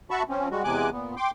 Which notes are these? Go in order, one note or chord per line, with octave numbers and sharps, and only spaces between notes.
F#4 E5 A5 B5 C#6
F3 C4 C#4
G3 G#3 F#4
E2 C3 G#3 G#5 D6 F#6
A#2 B3
G5 C6 D6